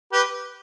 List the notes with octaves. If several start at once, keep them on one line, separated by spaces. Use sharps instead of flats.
G4 B4